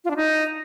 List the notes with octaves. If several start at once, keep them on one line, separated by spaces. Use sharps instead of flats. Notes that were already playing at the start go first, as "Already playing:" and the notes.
F4
D4
D#4